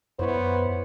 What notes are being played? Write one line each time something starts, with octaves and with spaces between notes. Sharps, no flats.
F#2 B3 E4 C5 C#5